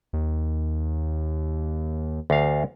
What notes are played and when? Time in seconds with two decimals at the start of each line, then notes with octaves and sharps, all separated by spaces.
0.13 D#2
2.30 D2 F5